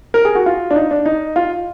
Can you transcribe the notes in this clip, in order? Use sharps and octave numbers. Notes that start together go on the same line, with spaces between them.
A#4
G#4
F#4
F4
D4
D#4
D4
D#4
F4